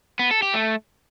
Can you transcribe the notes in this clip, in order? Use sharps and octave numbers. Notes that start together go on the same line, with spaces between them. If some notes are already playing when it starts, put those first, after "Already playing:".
B3
A4
G4
A3